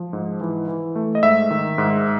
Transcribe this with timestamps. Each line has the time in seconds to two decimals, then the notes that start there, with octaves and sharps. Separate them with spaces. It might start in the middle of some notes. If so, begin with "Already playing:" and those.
Already playing: F3
0.13 G#2
0.41 E3
0.68 E3
0.96 A3
1.15 D#5
1.23 G#2 E5
1.50 D#3
1.78 G#2